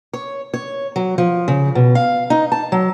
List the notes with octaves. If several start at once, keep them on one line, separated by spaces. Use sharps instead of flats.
C#5
C#5
F#3
F3
C#3
B2
F5
D#4
A5
F#3